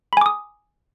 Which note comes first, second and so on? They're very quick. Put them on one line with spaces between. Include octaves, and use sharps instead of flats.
B5 G#5 D6 D#6